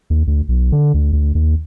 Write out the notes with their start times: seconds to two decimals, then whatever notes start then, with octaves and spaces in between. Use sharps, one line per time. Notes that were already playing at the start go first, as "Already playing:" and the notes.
0.10 D#2
0.27 D2
0.49 B1
0.72 D3
0.94 D2
1.13 D2
1.35 D#2